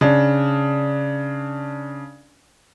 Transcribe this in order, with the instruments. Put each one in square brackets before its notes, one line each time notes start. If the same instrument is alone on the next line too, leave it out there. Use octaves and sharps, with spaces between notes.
[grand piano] C#3 D4